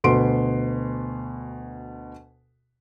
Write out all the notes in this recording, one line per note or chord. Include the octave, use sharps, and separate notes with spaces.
D2 B2 B4 C6 D7